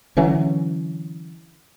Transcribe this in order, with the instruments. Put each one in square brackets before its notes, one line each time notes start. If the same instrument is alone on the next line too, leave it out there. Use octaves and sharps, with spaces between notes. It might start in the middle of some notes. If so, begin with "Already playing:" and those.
[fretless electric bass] D3 E3 F#3 C#4